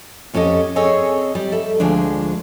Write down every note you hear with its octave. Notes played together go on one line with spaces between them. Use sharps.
F2 C#4 G4 A4 D#5
C4 G#4 A4 C#5 D#5 G#5
G3
A4 E5
D2 F3 G#3 D4